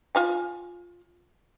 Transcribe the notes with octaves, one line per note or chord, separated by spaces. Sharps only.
F4 F5 G#5